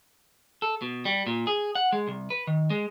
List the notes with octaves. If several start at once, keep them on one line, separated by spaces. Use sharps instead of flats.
A4
B2
G3
A#2
G#4
F#5
G#3
C2
B4
D#3
G#3